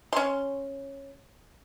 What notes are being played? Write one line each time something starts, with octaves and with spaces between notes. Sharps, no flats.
C#4 C6